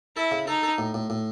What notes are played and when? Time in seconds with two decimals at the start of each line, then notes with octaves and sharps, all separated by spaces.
0.17 E4 A4
0.31 C#3
0.47 D#4 A4
0.63 A4
0.78 A2
0.94 A2
1.10 A2